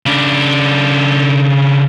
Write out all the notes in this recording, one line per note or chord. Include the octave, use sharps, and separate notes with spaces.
C#3 D4